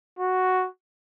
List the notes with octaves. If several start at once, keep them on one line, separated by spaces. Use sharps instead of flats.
F#4